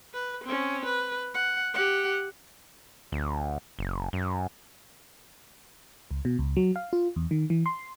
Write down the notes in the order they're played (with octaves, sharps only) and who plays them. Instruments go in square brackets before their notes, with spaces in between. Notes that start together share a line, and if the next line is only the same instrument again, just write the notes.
[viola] B4
C4 C#4
B4
F#5
G4 F#5
[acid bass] D2
F#1
F#2
[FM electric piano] C#2
B2
C#2
F#3
F5
F4
E2
D#3
E3
C6